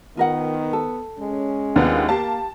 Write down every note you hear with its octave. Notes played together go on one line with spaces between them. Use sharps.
D#3 B3 F4 A#4 F#5
A4
G#3 C#4
D#2 B3 D4 F4 F5
A#3 G4 F5 A5